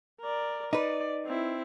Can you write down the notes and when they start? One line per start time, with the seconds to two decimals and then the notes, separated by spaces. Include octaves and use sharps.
0.21 A#4 D5
0.73 D#4 B4 D5
1.26 C4 E4